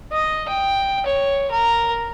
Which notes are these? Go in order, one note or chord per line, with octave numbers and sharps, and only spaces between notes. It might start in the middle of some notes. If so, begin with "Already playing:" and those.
D#5
G5
C#5
A#4